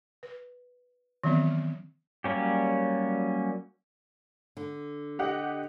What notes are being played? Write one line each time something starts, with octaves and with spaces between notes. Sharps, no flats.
B4
D#3 E3 F#3 B3 C4
F#3 G3 A#3 C#4 G4
D3
G4 D#5 F#5